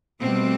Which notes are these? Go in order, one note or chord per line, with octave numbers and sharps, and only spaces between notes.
B2 G3 A3 C4